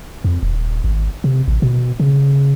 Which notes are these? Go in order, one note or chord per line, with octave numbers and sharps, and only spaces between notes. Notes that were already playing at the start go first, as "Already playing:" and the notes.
F2
D#1
G#1
C3
A1
B2
C#3